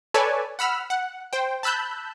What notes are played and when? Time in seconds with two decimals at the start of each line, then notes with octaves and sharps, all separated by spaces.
0.14 A4 B4 C#5 D5 G#5 A5
0.59 F#5 B5 E6 F6
0.90 F#5
1.33 C5 G5
1.63 A5 B5 E6 F#6 G6